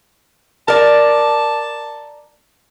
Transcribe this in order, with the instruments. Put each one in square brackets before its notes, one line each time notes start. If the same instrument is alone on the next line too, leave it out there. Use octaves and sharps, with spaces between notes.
[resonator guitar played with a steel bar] A#4 D5 [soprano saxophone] A5